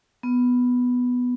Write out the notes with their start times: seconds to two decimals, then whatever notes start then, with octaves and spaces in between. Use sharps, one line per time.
0.23 B3